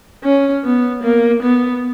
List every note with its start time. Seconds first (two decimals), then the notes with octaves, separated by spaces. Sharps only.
0.24 C#4
0.64 B3
1.03 A#3
1.43 B3